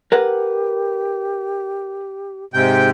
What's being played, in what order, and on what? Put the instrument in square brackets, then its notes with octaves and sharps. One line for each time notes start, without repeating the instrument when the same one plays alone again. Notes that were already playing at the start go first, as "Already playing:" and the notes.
[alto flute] G4 [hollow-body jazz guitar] A#4 B4 F#5
[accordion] G#2 C3 G5